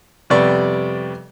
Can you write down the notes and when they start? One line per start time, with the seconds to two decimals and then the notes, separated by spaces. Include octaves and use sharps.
0.30 F2 C3 G3 B3 D5 C#6